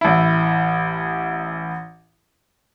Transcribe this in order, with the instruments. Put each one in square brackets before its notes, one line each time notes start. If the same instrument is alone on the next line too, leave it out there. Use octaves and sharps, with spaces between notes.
[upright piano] A1 E4